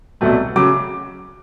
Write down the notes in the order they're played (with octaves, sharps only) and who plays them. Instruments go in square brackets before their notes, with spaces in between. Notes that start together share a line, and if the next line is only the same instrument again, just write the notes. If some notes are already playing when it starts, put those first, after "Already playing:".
[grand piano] C2 B2 F#3 A3
C#3 F#3 D6